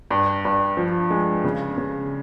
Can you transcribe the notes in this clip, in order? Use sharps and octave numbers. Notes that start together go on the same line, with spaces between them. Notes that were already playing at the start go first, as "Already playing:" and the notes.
G2
G2
F3
G#3
C#3
C#3